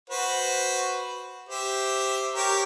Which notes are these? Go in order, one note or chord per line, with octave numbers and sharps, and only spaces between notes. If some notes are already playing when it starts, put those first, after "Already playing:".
F#4 B4 C5
G4 C5 E5
G4 A#4 C#5